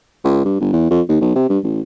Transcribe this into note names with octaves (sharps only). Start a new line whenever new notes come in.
C#2
G2
G1
E2
F2
D#2
B1
C3
G2
A1